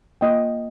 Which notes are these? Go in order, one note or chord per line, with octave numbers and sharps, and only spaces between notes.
A#3 F4 D#5 G5